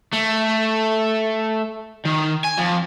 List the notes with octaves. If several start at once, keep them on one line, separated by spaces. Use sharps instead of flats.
A3
D#3
G#5
F2